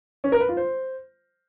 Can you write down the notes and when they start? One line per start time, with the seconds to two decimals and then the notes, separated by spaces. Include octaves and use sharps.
0.24 C#4
0.32 A#4
0.40 B4
0.49 F4
0.57 C5